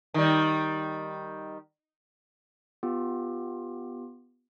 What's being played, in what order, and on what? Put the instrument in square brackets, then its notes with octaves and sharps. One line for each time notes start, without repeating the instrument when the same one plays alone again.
[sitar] D#3 G3
[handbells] B3 F4 G4